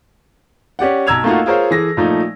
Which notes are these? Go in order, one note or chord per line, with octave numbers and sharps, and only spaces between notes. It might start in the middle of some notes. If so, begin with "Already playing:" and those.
C#4 G4 D5 F#5
B1 A#5 E6 G#6 F7
A3 A#3 D#4 F4 F#4
F4 G#4 A#4 C5 C#5 F5
E3 G#4 A4 A#6
A#2 F3 A3 D#4